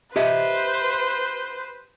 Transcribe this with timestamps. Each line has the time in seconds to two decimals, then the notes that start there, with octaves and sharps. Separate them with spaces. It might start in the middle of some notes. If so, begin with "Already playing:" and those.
0.16 G4 B4 C5 D#5 E5